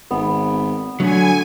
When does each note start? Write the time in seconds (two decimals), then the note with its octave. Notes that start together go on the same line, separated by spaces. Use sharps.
0.11 G#1 B3
1.00 D3 F#3 A3 G#5